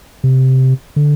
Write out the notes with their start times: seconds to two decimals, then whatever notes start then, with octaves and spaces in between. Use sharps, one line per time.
0.24 C3
0.96 D3